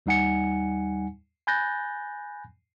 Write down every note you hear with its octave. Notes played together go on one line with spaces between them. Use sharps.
D#2 G3 D#4 F#5 G#5 C#7
G#5 B5 F#6 G6 A6 A#6